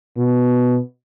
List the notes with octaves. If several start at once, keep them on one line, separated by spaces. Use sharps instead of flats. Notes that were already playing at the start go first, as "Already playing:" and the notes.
B2